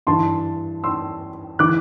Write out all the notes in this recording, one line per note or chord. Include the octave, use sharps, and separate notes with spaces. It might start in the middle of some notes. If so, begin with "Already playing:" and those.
G2 E3 A5 C6
C6 E6
E3 D6 F#6